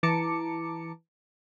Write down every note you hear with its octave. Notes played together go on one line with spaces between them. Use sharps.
E3 A5 A#5 D6 C#7